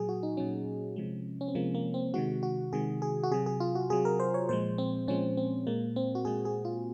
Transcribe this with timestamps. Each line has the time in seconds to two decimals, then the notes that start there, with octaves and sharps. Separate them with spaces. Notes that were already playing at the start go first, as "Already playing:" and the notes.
Already playing: A#2 F#3 G#4
0.09 F#4
0.23 D#4
0.37 A#2 F#3 C#4
0.96 C3 F3 G#3
1.41 C#4
1.48 C4
1.55 C3 F3 G#3 A#3
1.75 A#3
1.94 C4
2.14 C3 D#3 G#3 F#4
2.43 F#4
2.73 C3 D#3 G#3 G#4
3.02 G#4
3.24 F#4
3.31 C3 F#3 G#4
3.46 G#4
3.60 F4
3.75 F#4
3.90 C3 F#3 G#4
4.05 A#4
4.20 C5
4.34 C#5
4.49 A#2 F3 G#3 C5
4.78 C4
5.08 A#2 F3 G#3 C#4
5.37 C4
5.67 A#2 G#3 A#3
5.96 C4
6.15 F#4
6.25 A#2 G#3 G#4
6.45 G#4
6.65 F4